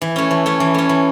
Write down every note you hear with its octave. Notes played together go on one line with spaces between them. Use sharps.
E3
A3 C#4
E3
A3 C#4
E3
A3 C#4
E3